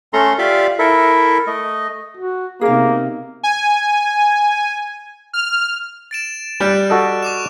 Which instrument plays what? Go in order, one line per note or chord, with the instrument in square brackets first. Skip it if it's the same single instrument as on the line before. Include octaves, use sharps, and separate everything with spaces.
[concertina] A3 C#4 A4 A#5 C6
F4 G4 D5 E5 F5
E4 A4 A#4 E5
A3 D#5
[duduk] F#4
[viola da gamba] C3 B3 [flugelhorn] A#3 [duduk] D#4 [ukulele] G#4 F5
[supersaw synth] G#5
F6
[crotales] A6 D7 E7
[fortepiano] G3 [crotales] F6 F#6 D7
[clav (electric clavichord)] F#4 A4 D#5
[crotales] C#6 D6 E7